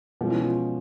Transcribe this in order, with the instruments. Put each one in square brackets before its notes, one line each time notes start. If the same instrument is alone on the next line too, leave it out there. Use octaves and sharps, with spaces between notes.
[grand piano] B2 G#3 C#4 [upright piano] F3
[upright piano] E3
F3